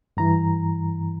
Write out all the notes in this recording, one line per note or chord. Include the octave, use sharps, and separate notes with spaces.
G2 E3 A#5